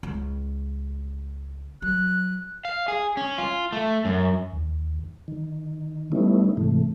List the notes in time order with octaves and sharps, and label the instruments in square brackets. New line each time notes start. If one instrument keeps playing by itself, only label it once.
[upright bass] C#2
[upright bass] F#3 [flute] F#6
[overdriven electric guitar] F5
G#4
C#4
F4
A3
F#2
[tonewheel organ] D#2
D#3
G3 A3 B3 C#4 D#4 E4
G#2 C3 E3 A3